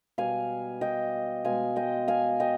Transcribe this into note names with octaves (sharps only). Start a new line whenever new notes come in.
B2 G3 F5 G#5
D#5 G5
B2 G#3 F5 G#5
D#5 G5
F5 G#5
D#5 G5